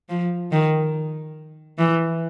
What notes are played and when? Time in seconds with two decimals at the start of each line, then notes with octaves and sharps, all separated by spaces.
0.09 F3
0.52 D#3
1.78 E3